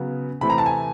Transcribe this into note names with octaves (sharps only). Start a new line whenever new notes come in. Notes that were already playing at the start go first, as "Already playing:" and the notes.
Already playing: C#3 F#3 B3
C3 E3 A3 C4 B5
A#5
A5
G#5